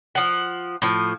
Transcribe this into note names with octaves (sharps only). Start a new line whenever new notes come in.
F3 F#5
A2 F3